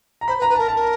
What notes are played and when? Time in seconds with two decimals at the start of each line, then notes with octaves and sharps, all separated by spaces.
0.21 A#5
0.28 C5 B5
0.39 B4
0.42 A#5
0.49 B4
0.55 A#4 A5
0.68 A5
0.76 A#4